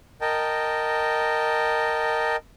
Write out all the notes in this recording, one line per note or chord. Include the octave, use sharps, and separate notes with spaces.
A#4 D#5 G5 A5